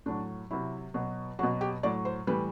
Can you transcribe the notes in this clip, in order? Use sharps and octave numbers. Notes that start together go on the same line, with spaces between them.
A2 F#3 D4
C3 F#3 E4
B2 F#3
B2 F#3 F#4
G4
A2 F#3 D5
C5
A2 E3 G3 B4